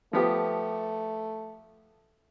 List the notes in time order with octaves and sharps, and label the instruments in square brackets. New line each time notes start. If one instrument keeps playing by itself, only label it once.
[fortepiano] F3 B3 G4 [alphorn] A3